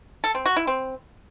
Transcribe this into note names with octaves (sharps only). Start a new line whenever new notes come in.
A4
C4
F#4
E4
C4